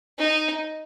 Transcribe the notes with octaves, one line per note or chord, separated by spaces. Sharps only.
D#4